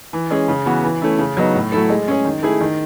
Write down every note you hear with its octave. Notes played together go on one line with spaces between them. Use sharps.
E3
G#3 C#4 G#4
C#3
E3 B3 F#4
E3
A3 C#4 E4
C#3
F#3 B3 D#4
A2
F#3 A3 E4 A4
G#3
C#4 G#4
D#3
A3 E4 G#4
D#3